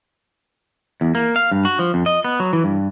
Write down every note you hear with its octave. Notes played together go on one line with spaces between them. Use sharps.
E2
A#3
F5
G2
F#4
F3
F2
D#5
B3
F#3
E3
G2